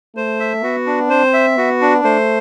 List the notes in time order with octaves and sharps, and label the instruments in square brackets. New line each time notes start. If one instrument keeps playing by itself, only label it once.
[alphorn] A3 [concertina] C5
[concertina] E5
[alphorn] B3 [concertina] F#4
[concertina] D4
[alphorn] C4 [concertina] C5
[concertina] E5
[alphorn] B3 [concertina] F#4
[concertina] D4
[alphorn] A3 [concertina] C5